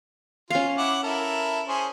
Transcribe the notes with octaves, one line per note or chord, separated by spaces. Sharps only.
C#4 F4 F5
E4 F#5 D6
E4 A4 A#4
C#4 G#4 C5